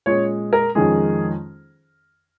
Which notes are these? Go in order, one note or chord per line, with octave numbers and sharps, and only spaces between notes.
A#2 G#3 C#4 C#5
A#4
F2 D#3 G#3 C#4 G#4